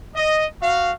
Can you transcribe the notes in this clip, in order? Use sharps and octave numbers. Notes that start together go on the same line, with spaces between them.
D#5
F#4 F5